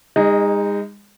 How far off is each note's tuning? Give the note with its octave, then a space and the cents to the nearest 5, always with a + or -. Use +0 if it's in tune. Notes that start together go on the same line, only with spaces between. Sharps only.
G#3 -35 D#4 +0